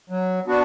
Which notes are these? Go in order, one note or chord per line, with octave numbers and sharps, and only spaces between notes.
F#3
B3 D4 F#4